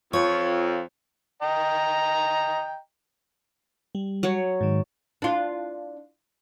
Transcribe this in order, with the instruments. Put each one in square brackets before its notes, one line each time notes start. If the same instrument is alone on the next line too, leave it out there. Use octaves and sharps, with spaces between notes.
[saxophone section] F2 [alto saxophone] F4 [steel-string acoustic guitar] C#5
[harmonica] D#5 G5 A#5
[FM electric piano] G3
[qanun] F#3 C#5
[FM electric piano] G#2 D#3
[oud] D4 F4